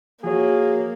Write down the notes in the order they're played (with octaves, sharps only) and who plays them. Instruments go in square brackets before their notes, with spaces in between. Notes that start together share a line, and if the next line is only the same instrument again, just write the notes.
[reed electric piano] F3 F#4 C#5 [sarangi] A#3 [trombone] G#4